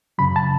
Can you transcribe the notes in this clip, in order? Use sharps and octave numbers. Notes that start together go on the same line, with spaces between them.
F#2 C#3 F#3 B5
A5